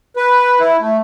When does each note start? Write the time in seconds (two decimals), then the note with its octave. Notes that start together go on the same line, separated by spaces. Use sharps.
0.16 B4
0.60 E4
0.80 A3